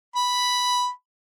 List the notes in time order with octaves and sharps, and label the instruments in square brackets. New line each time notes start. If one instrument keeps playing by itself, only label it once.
[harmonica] B5